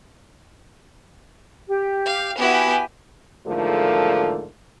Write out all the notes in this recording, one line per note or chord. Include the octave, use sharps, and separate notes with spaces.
G4
F5
B3 E4 F#4 G4 G#5
E2 G#2 D3 F3 A3 A#3